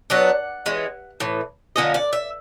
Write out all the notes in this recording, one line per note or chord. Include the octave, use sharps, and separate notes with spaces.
F#3 B3 D4 F#5
E3 G#3 C#4
A2 E3
D3 F3 A#3 C#4 D#5
D5
E5